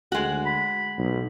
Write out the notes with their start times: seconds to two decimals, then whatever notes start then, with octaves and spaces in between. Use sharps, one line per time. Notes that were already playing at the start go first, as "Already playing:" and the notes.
0.12 D2 G#3 F#4
0.46 B5
0.98 B1